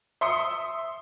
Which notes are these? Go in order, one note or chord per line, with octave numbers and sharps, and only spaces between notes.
E5 C6 D#6 C#7